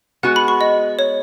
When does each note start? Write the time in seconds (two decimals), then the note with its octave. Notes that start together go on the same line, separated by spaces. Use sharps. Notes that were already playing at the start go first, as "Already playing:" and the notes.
0.23 G#3 B3 F#4 F#5
0.36 B5
0.48 C#6
0.61 D#5
0.99 C#5